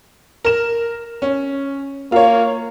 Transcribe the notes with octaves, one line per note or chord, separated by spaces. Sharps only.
A#4 E7
C#4
A#3 F4 C#5